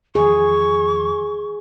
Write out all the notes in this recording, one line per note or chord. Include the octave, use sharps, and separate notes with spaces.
E2 D#3 F3 G#4 C#6